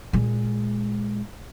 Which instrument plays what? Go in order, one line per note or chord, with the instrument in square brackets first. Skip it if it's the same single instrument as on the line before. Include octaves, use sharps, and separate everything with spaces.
[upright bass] A#2 G#3